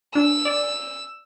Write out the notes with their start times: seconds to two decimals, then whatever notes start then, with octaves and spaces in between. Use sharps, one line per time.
0.15 D4 E6
0.45 D5